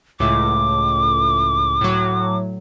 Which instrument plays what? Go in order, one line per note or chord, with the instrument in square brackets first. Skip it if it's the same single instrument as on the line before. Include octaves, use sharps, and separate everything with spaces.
[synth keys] C#2 A2 [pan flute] D6
[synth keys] A2 F#3